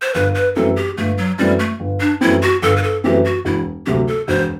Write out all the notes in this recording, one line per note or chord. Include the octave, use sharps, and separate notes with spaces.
C5
G1 B4
B4
F#2 E3 A3 C4 A4
G4
G1 A3
F#3
F#2 E3 G3 A3 C4
A3
G1
D4
F#2 E3 A3 C4 E4
F#4
G1 A4
B4
A4
F#2 E3 A3 C4 G4
F#4
E1 E4
D2 C3 F#3 A3 G4
A4
E1 C5